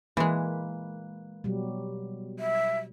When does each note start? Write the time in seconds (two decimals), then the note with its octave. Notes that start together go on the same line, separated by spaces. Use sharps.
0.17 E3 G#3 A#3 B4
1.44 B2 F#3 G3
2.39 E5